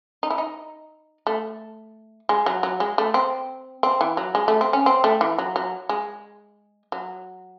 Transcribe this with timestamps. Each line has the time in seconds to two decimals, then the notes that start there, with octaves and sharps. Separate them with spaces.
0.23 D#4
0.30 E4
0.38 D#4
1.27 A3
2.29 G#3
2.46 F#3
2.63 F#3
2.80 G#3
2.98 A3
3.14 C4
3.83 C4
4.01 E3
4.17 F#3
4.35 G#3
4.48 A3
4.61 C4
4.73 C#4
4.86 C4
5.04 A3
5.21 E3
5.38 F#3
5.56 F#3
5.89 G#3
6.92 F#3